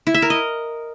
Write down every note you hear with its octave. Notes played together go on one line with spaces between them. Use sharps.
E4
E5
A#4
D#5